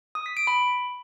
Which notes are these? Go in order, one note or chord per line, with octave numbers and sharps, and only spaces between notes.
D#6
B6
D7
B5